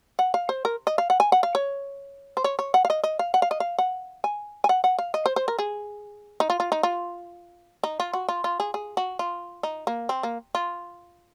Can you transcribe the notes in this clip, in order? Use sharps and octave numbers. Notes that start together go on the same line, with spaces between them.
F#5
F5
C5
A#4
D#5
F5
F#5
G#5
F#5
F5
C#5
C5
C#5
C#5
F#5
F5
D#5
D#5
F5
F#5
F5
D#5
F5
F#5
G#5
G#5
F#5
F#5
F5
D#5
C5
C5
A#4
G#4
D#4
F4
F4
D#4
F4
D#4
F4
F#4
F4
F4
G#4
G#4
F#4
F4
D#4
A#3
C4
A#3
F4